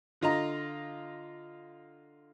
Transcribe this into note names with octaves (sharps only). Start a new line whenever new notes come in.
D3 F4 D#5 A#5